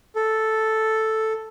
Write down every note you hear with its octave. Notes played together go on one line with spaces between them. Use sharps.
A4